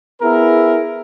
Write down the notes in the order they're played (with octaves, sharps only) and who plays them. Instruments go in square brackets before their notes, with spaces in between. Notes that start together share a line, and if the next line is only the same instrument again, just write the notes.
[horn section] B3 E4 G#4 A#4